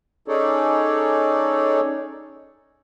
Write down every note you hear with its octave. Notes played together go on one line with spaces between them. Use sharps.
C#4 D#4 G#4 A4 C#5 D5